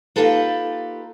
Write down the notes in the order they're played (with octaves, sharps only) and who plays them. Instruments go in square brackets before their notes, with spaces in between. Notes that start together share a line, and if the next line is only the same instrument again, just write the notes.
[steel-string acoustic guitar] A#3 D#4 F4 G4 A4 B4